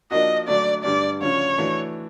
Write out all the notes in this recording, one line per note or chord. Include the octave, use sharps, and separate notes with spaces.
F3 A#3 D4 F#4 D#5
D3 F#3 A3 D4 F#4 D5
G2 D3 G3 D5
D2 C#3 F3 C#5
E3 A3 D4 F#4